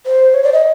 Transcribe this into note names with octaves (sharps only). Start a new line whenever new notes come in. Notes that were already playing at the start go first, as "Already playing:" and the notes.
C5
C#5
D5
D#5